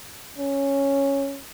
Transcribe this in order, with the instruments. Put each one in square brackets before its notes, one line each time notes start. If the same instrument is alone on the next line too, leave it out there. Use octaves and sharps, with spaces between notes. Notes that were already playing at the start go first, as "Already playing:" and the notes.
[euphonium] C#4